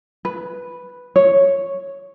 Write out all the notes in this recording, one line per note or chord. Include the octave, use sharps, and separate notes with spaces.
B4
C#5